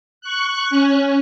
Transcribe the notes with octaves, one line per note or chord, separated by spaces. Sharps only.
C#6 F#6
C#4